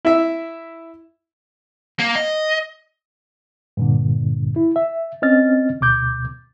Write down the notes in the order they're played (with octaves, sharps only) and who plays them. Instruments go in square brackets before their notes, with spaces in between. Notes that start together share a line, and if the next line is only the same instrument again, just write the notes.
[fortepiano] E4 E5
[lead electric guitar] A#3
D#5
[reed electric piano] G2 A#2 D3
E4
E5
C4 C#4 D#5 F6 A6
D2 B2 D6 G6